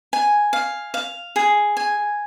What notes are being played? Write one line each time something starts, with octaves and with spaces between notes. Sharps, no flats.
G#5
F5
F5
G#4
G#5